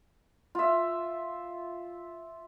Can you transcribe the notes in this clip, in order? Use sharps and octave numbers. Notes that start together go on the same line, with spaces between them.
F4 E5